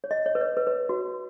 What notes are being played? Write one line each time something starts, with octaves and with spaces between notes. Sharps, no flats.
C#5
D#5
C#5
B4
C#5
B4
B4
F#4